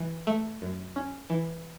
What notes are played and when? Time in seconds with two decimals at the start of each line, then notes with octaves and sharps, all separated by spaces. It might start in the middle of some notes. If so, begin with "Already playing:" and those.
Already playing: E3
0.27 A3
0.62 F#2
0.96 C#4
1.30 E3